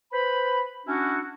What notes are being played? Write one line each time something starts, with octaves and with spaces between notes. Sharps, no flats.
B4 C5 B5
C#4 D4 E4 F#4